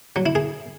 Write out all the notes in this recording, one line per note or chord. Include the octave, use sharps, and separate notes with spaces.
F#3
E4
G#4